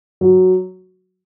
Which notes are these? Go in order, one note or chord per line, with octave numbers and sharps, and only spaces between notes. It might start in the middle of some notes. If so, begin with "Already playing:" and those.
F#3